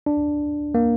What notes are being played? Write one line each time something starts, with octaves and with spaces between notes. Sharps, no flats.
D4
A#3